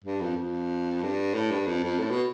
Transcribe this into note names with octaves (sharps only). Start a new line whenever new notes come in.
G2
F2
F2
G2
A2
G2
F2
F2
A2
B2